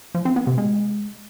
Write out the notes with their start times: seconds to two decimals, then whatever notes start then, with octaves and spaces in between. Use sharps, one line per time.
0.15 F3
0.25 C4
0.36 B3
0.47 C3
0.58 G#3